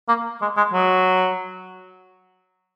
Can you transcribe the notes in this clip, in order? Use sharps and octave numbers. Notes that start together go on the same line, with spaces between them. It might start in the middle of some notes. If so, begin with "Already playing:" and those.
A#3
G#3
G#3
F#3